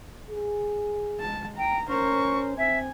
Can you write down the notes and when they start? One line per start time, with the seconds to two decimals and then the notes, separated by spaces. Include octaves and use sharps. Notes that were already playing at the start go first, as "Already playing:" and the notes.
0.31 G#4
1.20 G#3 A5
1.58 G5 A#5
1.89 C#4 A#4 C5 C#6
2.58 C4 E5 G#5